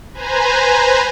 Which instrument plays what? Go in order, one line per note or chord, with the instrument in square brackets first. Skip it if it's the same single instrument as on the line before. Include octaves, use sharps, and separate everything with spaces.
[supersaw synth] B4 C5 G#5 A#5